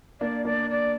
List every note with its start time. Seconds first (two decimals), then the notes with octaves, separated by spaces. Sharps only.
0.21 A#3 D4 D5
0.45 A#3 D4 D5
0.70 D5